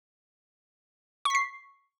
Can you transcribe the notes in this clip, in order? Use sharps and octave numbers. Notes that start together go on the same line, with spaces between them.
C#6 B6 C7